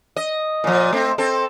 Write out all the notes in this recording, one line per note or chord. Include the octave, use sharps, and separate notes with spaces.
D#5
A#2 F3
A3 C4
C4 A4